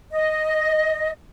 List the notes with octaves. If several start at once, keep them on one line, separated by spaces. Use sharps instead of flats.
D#5